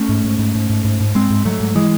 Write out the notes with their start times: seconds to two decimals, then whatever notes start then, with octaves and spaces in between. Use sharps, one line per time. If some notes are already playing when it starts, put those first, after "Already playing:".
Already playing: A3 C#4
0.09 G#2
0.24 G#2
0.39 G#2
0.55 G#2
0.70 G#2
0.85 G#2
1.00 G#2
1.15 G#2 G#3 C4
1.30 G#2
1.45 G#2 F#3 A3
1.60 G#2
1.75 E3 G#3